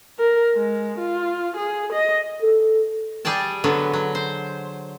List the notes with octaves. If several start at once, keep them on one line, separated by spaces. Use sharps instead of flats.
A#4
G#3
F4
G#4
D#5
A4
G3 G#4 D5 G5 A5
D3 F#3 B3
F#3
C5